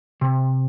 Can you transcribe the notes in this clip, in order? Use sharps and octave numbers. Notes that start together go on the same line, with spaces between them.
C3